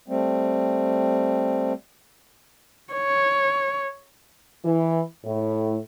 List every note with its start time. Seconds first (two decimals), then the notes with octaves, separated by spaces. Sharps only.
0.08 G3 A3 C4
2.93 C#5
4.64 E3
5.24 A2